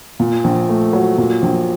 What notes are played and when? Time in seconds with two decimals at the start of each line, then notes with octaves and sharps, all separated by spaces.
0.20 A#2
0.44 A#1
0.69 A3
0.93 F#3
1.18 A#2
1.42 A#1